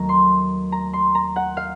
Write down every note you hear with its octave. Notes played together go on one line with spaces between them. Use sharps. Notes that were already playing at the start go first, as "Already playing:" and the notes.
Already playing: D#2 D#3 F#3 A3 A#5
C6
A#5
C6
A#5
F#5
F5